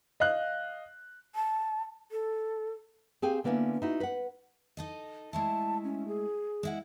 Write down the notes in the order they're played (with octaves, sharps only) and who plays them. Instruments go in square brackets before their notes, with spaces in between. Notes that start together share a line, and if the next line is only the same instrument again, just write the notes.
[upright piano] D#5 F5 F#6
[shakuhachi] A5
A4
[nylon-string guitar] C4 G4 G#4 F5 G5 G#5
D3 A#3 B3 C#4 E4
D#4 E4 F#4
B4 F#5
[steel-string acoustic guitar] D#4 A4 D#5
[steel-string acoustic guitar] G#3 A3 E4 [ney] A5
[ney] C#4
G#4
[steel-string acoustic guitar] G#3 E4 F#5